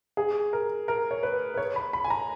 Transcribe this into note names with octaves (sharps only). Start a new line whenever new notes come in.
G#4
A#4
A#4
C#5
B4
B4
C#5
B5
B5
G#5
A#5